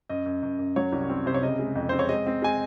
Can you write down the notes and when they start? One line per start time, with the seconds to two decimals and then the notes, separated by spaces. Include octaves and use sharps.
0.09 F#2 D#5
0.26 F#2
0.43 F#2
0.59 F#2
0.76 F#3 C#5
0.92 C2
1.10 C4
1.26 C3 C5
1.34 C#5
1.42 C#3 D#5
1.59 G#3
1.75 F2
1.89 C4 C5
1.99 C#5
2.09 G#3 D#5
2.27 C4
2.42 G#3 G#5